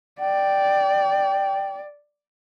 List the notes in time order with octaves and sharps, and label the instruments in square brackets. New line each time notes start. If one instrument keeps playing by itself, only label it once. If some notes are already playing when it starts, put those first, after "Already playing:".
[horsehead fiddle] D5 [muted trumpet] G5